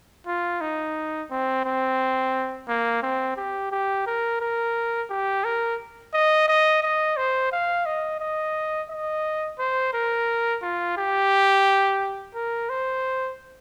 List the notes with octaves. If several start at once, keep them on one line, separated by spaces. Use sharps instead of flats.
F4
D#4
C4
C4
A#3
C4
G4
G4
A#4
A#4
G4
A#4
D#5
D#5
D#5
C5
F5
D#5
D#5
D#5
C5
A#4
F4
G4
A#4
C5